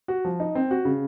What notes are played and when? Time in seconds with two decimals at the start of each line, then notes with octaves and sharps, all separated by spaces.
0.08 F#4
0.25 F3
0.40 D#4
0.55 C4
0.71 F#4
0.85 C#3